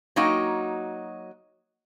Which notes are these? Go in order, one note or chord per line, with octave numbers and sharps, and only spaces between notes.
F#3 A#3 D#4 F#4 G5